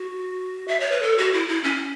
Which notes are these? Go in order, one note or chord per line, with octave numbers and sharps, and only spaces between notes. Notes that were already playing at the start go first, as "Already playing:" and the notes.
Already playing: F#4
E5
C#5
B4
A4
F#4
E4
E4
C#4